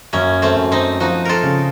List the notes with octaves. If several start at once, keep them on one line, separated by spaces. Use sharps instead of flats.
F#2 A#3 C#4
A3 C4
F#2
C4 D#4
F3 D#4 F#4
F4 A4 A#4
C#3